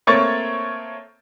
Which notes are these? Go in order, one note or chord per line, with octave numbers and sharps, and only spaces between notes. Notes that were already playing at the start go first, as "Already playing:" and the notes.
A3 A#3 C4 C#5 C#6 A6